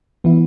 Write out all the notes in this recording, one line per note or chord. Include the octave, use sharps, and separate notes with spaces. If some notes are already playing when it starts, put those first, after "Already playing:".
E3 B3 E4